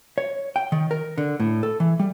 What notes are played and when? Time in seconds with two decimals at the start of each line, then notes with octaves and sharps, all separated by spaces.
0.18 C#5
0.56 G5
0.72 D#3
0.91 A#4
1.18 D3
1.40 A2
1.63 A4
1.80 E3
1.99 G3